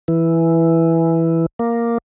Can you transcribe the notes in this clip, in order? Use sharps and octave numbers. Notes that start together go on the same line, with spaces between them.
E3
A#3